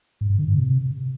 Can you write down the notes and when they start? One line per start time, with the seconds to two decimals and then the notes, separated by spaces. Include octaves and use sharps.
0.21 G#2
0.30 G2
0.38 D3
0.47 G#2
0.56 C3